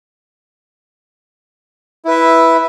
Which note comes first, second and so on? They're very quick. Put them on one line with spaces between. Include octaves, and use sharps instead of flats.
E4 B4 E5